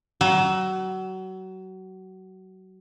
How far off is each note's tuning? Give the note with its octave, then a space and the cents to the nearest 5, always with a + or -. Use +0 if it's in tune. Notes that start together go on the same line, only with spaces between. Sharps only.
F#3 +25